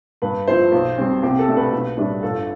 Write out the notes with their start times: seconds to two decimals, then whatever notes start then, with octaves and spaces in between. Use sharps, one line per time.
0.22 G2 B4
0.47 F3 B3 E4 C5
0.72 B1
0.98 B2 G3 C4
1.23 C2 G4
1.39 A4
1.47 B2 A3 D4
1.56 B4
1.72 B1
1.97 A2 G3 D4
2.22 G1 A4